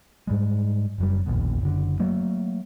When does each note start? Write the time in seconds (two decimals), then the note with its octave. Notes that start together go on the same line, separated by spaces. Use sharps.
0.27 G#2 G3 G#3
0.98 F#1 F#2 G3
1.26 E1 A#1 D#2 B2
1.61 F#1 D3
1.99 F#3 A3 A#3